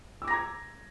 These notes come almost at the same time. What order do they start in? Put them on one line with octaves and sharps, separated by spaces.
E6 D6 A#6 A#5 G#6